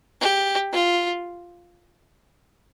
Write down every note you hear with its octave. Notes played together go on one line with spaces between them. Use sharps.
G4
F4